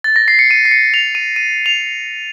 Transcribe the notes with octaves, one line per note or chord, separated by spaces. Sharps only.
A6
A#6
C7
C#7
D#7
C7
C#7
F7
D#7
D#7
F7